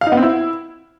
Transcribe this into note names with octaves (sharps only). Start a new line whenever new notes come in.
F5
D#4
B3
C4
E4